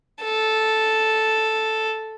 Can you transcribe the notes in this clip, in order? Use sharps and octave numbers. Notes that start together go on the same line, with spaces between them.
A4